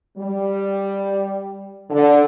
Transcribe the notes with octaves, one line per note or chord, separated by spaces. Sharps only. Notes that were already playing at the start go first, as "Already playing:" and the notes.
G3
D3